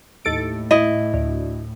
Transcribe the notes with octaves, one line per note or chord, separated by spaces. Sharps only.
D#2 A2 A4 D7
E4 D#5
D2